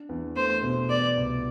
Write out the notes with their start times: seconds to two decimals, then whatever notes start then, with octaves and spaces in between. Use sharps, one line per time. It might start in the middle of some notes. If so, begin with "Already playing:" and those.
Already playing: D4
0.09 E2
0.37 A3 C5
0.62 B2
0.89 B3 D5
1.17 C2